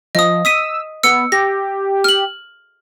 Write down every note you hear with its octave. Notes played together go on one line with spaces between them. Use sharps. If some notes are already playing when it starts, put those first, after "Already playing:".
F3 D#5 D#6
D#6 E6 B6 D#7
B3 E6 C#7
G4 A#6
F6 F#7